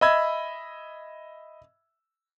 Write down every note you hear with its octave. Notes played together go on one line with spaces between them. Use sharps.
D#5 E5 B5 E6 G#6